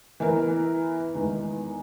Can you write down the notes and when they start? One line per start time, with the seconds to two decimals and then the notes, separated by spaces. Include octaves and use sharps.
0.20 E3 B3 E4 A#4
1.14 E2 D#3 G#3 B3 D#4